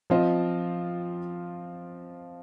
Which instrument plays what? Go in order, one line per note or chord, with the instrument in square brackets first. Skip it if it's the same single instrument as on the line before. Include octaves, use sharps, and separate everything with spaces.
[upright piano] F3 C4 F4 C5 D#5